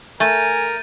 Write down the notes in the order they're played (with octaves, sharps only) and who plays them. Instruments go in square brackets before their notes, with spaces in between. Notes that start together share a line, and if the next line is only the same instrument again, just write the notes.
[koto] A3 [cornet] A#4 [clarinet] G#5 [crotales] G6 A6 D#7